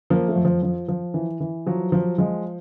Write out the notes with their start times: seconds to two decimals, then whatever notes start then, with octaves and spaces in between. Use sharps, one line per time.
0.10 F3 A#3
0.28 A3
0.36 F2
0.45 F3
0.63 F3
0.88 F3
1.14 E3
1.40 E3
1.67 F3 F#3
1.92 F3
2.18 F3 G#3